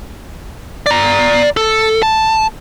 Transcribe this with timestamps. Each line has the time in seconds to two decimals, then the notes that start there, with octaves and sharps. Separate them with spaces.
0.86 D5 A#5
1.57 A4
2.03 A5